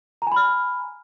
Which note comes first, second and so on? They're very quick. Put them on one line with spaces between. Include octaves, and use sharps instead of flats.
A#5 G#5 B5 F6